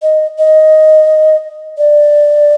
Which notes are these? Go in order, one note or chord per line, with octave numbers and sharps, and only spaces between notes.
D#5
D#5
D5